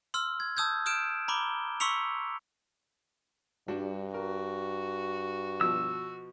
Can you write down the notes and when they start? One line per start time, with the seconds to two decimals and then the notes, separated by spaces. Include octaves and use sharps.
0.14 C6 E6 F6
0.40 G#6
0.57 A5 D#6 E6 G6 G#6
0.86 D#6 F6 G6 D7 E7
1.28 A#5 B5 D6 G7
1.80 C6 C#6 E6 B6 C#7 F7
3.68 G2 G3 D4 F#4
4.14 F#4 A#4
5.61 B2 F3 E6